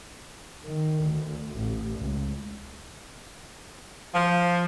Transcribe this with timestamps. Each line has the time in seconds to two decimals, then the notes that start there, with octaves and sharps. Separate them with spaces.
0.65 D#3
1.04 D2
1.55 A1
2.00 C#2
4.15 F3